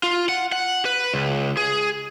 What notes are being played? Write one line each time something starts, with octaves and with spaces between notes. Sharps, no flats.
F4
F#5
F#5
B4
C#2
G#4